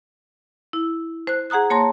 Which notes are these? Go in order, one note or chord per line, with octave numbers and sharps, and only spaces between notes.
E4
C5 F#6
G#4 F#5 A#5 D#6 F#6
A#3 C#5 A5 A#5 C6 A#6